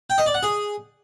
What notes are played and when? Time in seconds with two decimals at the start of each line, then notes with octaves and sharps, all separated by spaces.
0.10 G5
0.18 D#5
0.26 D5
0.34 F#5
0.43 G#4